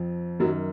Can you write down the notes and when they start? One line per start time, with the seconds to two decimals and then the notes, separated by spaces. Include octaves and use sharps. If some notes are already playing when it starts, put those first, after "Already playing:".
Already playing: F2 F3
0.40 F#2 F#3
0.43 D#3